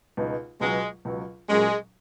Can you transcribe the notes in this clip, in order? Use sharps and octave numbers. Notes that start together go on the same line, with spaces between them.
C#2 B2 G#3 D#4
C#2 B2 F#3 G#3
C#2 B2 F#3
A#2 F#3 G#3 C#4